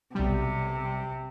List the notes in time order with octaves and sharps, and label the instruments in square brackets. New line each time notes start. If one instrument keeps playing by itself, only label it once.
[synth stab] B1 G3 [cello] C3